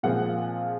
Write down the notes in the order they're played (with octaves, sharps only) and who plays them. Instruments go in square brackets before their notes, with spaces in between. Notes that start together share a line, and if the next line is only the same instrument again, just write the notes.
[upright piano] A#2 F3 G#3 C4 F4 F#5